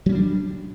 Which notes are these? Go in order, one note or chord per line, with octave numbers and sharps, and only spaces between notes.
F#3 G3 C#4 D4